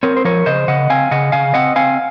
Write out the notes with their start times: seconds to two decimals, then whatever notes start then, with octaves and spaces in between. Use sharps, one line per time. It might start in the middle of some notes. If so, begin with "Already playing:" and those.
0.03 C4 A#4 C#5
0.17 C5
0.25 F3 A#4 C#5
0.46 C#3 C5 D#5
0.68 C#3 D#5 F#5
0.90 C4 F5 G#5
1.11 C#3 D#5 F#5
1.32 C#3 F5 G#5
1.54 C4 D#5 F#5
1.76 C4 F5 G#5